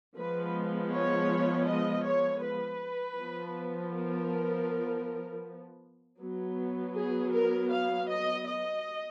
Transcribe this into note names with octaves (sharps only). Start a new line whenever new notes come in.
F3 G#3 B3 B4
C#5
D#5
C#5
B4
F3 B3
A#4
F#3 B3
G#4
A#4
F5
D#5
D#5